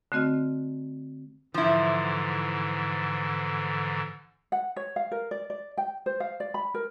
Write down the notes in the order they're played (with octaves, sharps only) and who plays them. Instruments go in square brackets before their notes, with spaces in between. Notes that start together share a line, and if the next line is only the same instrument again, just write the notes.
[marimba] D3 A3 C4 F#4 D#5 F6
[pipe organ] G#2 D3 E3 [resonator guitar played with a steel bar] F3 E4
[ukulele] F#5
C#5
F5
A#4
D5
D5
G5
C5
F5
D5
B5
A#4